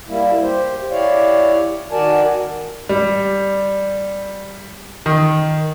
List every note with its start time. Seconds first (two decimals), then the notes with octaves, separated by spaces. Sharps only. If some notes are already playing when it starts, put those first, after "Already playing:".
0.08 G3 A#3 E4
0.42 G4 C5
0.91 E4 G4 C#5 D5 F5
1.91 D#3 F#4 A#4 D5 G#5 A5
2.89 G3
5.06 D#3